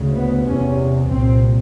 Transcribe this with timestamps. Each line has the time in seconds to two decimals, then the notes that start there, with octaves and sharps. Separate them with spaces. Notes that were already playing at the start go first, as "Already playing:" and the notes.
Already playing: D2 C#3
0.15 B3
0.47 E2 C3 C#4
1.09 C2 A#2 C4